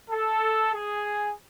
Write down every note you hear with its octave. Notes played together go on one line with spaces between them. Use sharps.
A4
G#4